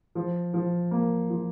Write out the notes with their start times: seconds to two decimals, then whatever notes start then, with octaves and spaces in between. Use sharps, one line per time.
0.15 F3
0.54 F3
0.91 A#3
1.30 F3